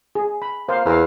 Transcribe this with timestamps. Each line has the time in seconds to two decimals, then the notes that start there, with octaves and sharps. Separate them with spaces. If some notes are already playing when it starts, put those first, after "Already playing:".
0.15 G#4
0.42 B5
0.69 A#3 C5 F5
0.86 E2 A#4 F5